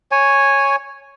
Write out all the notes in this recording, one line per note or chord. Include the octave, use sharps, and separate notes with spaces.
C#5 G#5